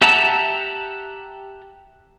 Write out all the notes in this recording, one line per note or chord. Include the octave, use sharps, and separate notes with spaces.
G4 E5 F#5 A5 A#5